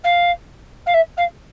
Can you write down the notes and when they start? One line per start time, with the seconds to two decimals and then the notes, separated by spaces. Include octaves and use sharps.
0.04 F5
0.86 F5
0.94 E5
1.17 F5